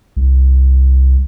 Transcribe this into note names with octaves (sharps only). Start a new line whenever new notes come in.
C2